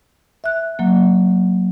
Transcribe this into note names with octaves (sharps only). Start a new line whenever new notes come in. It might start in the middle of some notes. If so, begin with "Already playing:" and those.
E5 F#6
F#3 A#3